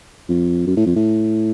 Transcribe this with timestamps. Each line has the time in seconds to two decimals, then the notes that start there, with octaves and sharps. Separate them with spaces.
0.29 F2
0.67 F#2
0.77 A2
0.86 F2
0.96 A2